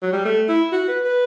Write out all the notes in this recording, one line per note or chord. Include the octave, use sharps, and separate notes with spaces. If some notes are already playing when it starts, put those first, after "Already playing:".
F#3
G3
A3
E4
F#4
B4
B4